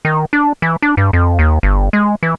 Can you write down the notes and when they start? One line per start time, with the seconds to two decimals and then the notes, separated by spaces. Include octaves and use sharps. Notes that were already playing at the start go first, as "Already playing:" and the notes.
0.05 D#3
0.33 D4
0.62 E3
0.82 D4
0.97 G2
1.13 F2
1.39 D#2
1.63 G1
1.93 G#3
2.23 E3